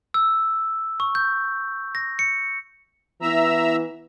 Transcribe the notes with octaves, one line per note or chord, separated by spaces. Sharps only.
E6
C#6
G6
A#6
C#7
E3 B3 E4 E5 A#5 E6